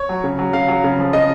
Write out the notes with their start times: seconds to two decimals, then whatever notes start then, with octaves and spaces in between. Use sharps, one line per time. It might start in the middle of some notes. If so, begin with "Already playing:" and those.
Already playing: C#5
0.09 F#3
0.24 C#3
0.39 F#3
0.53 C#3 F5
0.68 F#3
0.84 C#3
0.99 F3
1.13 C#3 D#5